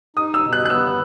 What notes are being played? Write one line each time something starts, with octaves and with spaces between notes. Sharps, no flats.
D#4 D#6
E6
B2
F#6
F#6
B3 E6